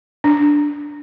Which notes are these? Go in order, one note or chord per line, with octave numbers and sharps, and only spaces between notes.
D4